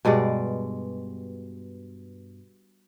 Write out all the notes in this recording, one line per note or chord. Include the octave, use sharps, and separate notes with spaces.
G2 B2 G#3 D5